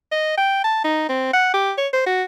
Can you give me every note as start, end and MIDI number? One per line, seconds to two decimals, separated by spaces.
0.11 0.37 75
0.37 0.62 79
0.64 0.80 81
0.84 1.05 63
1.09 1.32 60
1.33 1.52 78
1.54 1.72 67
1.78 1.87 73
1.93 2.04 72
2.06 2.23 66